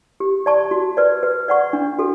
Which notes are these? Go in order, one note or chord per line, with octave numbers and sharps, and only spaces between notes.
G4
D5 A5 C#6
F#4
B4 D5
B4
D5 F#5 C#6
D4
F#4 A4